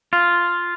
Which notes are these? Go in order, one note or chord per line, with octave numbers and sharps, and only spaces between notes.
F4